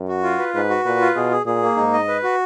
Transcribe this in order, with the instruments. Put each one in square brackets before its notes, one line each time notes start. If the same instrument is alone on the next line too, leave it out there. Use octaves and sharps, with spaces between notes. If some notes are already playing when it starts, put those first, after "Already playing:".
Already playing: [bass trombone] F#2
[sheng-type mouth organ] F#4
F4
B4
[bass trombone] G#2 [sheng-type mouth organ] B4
[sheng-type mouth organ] F#4
[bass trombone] A#2 [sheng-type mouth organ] B4
[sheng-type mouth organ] F4
[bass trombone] B2 [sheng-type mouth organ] G#4
[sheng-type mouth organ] G#4
[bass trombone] A#2 [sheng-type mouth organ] G#4
[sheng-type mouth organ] A#3
[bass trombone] G#2 [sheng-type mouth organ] D#4
[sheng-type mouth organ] D#5
B4
F#4